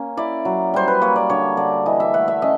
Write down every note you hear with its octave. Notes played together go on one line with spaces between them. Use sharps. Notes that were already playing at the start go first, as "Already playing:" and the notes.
Already playing: A#3 C#4
E4 D5
F#3
G3 C5
B4
A#3 C#5
D5
D3 C#5
D3 D5
E3 D#5
E5
A3 F#5
E5
C#4 D#5